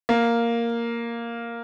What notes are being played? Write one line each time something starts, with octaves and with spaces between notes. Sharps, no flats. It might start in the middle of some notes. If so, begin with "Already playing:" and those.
A#3